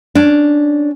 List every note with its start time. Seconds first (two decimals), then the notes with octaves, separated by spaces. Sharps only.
0.15 C#4 D4